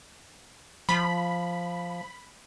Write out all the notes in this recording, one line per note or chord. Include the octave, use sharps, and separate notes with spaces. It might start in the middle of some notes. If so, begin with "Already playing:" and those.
F3 B5